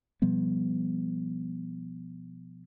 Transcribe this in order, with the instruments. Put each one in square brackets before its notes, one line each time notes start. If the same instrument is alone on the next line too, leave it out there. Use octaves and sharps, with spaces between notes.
[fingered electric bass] B2 F3 G3 B3